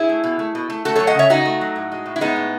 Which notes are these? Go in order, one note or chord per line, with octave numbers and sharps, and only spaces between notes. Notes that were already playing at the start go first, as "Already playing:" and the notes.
Already playing: E4 G#4
A3
B2
A3
B2
A3
A3 F#4 A4
F#3 A4 C#5
D#5 F#5
C#3 C#5 E5
C#3 D#4 F#4
A3
F#3
A2
G#3
A2
E4
G#3 B3 D#4
A2